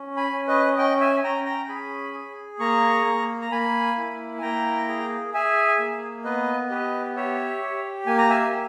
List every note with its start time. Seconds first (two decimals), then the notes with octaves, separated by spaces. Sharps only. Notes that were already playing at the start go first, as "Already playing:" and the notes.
Already playing: C#4
0.17 G#5 B5
0.33 C#4
0.48 B4 D#5
0.77 C#4 D#5 G5
1.00 E5 G#5
1.24 C#4 G5 A#5
1.46 G5 A#5
1.68 G#4 G#5 B5
2.14 G#4
2.60 A#3 A#5 C#6
3.06 A#3
3.42 A#5
3.51 A#3 G#5 B5
3.97 E4
4.38 G#5
4.42 A#3 G5 A#5
4.88 G#4
5.34 G#4 E5 G#5
5.79 A#3
6.24 B3 B4 D#5
6.70 G4 B4 D#5
7.16 G4 C#5 E5
7.62 G4
8.06 A#3 G#5
8.18 A#5
8.29 E5 G#5
8.53 A#3